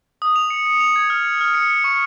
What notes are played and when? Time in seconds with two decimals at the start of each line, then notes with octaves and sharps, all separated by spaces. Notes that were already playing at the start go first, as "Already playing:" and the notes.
0.22 D#6
0.36 F7
0.50 C#7
0.66 C#7
0.80 F7
0.96 G#6
1.10 F6
1.25 C#7
1.41 F6
1.54 C#7
1.70 C#7
1.84 C#6